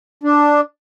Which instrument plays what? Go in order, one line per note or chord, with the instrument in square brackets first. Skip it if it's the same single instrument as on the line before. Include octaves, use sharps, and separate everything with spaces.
[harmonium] D4